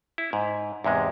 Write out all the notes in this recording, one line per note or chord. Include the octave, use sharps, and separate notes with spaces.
E4
G#2
E2 G#2 C3 G#3